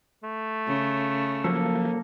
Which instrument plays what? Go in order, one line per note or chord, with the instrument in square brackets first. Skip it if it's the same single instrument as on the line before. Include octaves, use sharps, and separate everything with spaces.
[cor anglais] A3
[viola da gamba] C#3
[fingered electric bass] F3 F#3 [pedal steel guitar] A#3 A4